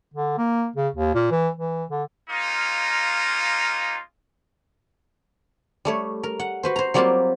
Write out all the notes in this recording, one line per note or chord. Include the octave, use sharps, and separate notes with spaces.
D3
A#3
C#3
D#2
A#2
E3
E3
D3
G#3 A#3 C#4 D#4 F4
G3 A3 C#5
A#4
F#5
F#4 B4 C5
C5 A#5
F#3 G3 A#3 C4 F4 G4